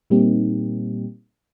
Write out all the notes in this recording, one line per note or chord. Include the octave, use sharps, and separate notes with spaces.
A#2 G3 A#3 C4 D#4 G4